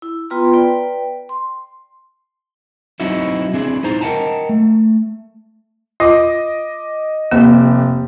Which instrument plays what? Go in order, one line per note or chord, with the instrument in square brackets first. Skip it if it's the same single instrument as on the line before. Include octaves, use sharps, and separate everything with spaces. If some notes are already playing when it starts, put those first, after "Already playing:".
[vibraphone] E4 E6
B3 F4 B4 G5 A#5 C6
B4 D5 G5
C6
[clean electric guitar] F#3 C4 D#4 E4 F#4 E5
C4 D4 E4 G#4
D#4 E4 C5 A#5
A#4 D#5 F#5 G5 A5 A#5
A3
[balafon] F4 [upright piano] D#5 D6
[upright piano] F1 G4 [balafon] A#3